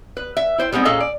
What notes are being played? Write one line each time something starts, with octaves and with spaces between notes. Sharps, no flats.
B4
E5
E4 C5 G5
G3 G#3 B3 C4 D#4
A#2 C#4 G#4 A4 D#5 F5
D5